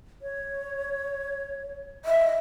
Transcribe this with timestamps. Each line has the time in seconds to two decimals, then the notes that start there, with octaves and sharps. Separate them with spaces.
0.22 C#5
2.05 D#5 E5